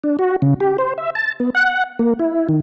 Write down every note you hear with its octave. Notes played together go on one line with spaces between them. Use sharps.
D4
F#4
C#3
G4
C5
E5
A5
B3
F#5
A#3
E4
D#3